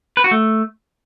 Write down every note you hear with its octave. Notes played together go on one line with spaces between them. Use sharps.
B4
F#4
A3